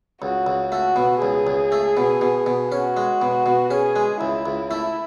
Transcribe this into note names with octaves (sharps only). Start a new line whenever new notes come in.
C#2 F#4
C#2
A3 F#4
B2
C#2 G#4
C#2
A3
B2
B2
B2
C#4 F#4
G#3
B2
B2
C#4 G#4
G#3
C#2 E4
C#2
A3 E4